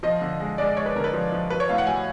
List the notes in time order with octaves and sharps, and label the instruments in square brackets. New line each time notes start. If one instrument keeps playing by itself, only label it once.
[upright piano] F3 D#5
D3
G#3
G#3 D5
G#3 C#5
B4
D3 A#4
B4
F3
F3
F#3 B4
C#5
A2 F5
F#5
F#3 G#5